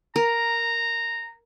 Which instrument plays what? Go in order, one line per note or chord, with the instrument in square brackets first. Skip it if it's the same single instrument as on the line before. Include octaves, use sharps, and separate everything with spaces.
[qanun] A#4 [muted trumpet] A#5